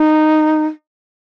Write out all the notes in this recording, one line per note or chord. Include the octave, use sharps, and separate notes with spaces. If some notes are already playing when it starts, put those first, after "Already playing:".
Already playing: D#4